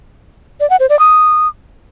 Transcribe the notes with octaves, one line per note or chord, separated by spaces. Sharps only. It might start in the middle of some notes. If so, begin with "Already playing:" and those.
D5
F#5
C5
D5
D#6